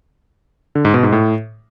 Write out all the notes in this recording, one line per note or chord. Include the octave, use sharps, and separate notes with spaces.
D3
G#2
B2
G#2
A2